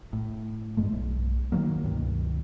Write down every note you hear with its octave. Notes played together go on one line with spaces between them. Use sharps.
A2
G2 G#3 A3
B1
D#3 F3 F#3 A#3
C#2 G2 B2 D#3